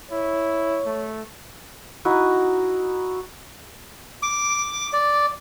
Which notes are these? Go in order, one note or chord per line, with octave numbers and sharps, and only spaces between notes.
E4 C#5
A3
D#4 E4 F#4 D#5
D6
D5